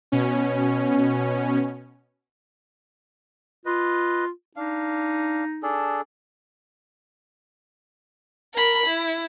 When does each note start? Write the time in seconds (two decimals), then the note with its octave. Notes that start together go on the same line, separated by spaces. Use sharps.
0.12 B2 C#4
3.66 F4 B4 D#5
4.56 D4 D#4 F5
5.63 D4 G#4 A4
8.54 A#4 B5
8.86 E4